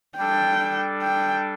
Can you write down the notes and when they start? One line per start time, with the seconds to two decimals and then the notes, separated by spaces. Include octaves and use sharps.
0.17 G3 D4 A4 G5
1.03 G5